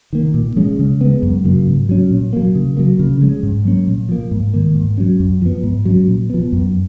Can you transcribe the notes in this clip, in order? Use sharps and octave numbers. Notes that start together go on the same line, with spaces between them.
D#3 A#3
A#2
F3 G#3 C#4
C#3
G#3 B3
F#2
C#3 F#3 A#3
G#2
F#3 C#4
A#2
F#3 A#3
C#3
F#3 A#3
C#3
F3 G#3 C#4
G#2
F#3 A#3 C#4
A#2
F3 A#3
G#2
D#3 A#3
G#2
F#3 C#4
F#2
F3 B3
G#2
F#3 C#4
A#2
F3 B3
F#2